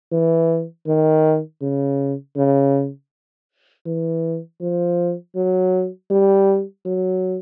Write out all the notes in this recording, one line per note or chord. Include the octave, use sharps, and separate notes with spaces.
E3
D#3
C#3
C#3
E3
F3
F#3
G3
F#3